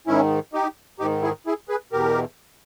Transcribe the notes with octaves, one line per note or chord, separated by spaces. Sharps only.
G#2 D#3 C#4 E4
D#4 G4
G#2 D#3 D#4 G4
E4 G#4
E4 G#4
G#4 B4
E2 B2 G4 A#4